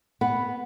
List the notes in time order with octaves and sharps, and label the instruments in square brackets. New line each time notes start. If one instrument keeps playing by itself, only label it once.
[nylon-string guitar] B3